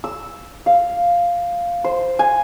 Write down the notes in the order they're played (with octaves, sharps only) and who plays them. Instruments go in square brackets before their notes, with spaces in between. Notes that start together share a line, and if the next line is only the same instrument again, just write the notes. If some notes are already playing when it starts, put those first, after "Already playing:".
[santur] E6
F5
C5
G#5